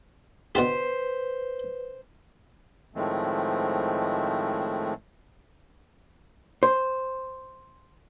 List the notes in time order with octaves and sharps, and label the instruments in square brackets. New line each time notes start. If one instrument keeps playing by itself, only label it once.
[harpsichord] B2 D3 G4 [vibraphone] B4 [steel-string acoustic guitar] C5
[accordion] A2 D#3 F3 G#3 A3 C4
[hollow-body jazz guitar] C5